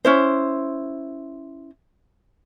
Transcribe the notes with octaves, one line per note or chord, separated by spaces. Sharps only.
C#4 E4 C5